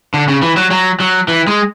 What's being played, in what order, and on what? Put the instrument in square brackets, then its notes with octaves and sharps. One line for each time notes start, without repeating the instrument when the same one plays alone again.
[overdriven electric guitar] D3
C#3
E3
F#3
F#3
F#3
E3
G#3